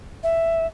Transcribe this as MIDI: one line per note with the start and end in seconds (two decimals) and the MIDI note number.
0.23 0.66 76